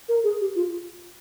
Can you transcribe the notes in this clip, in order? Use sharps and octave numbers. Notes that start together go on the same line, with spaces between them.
A#4
G#4
G4
F4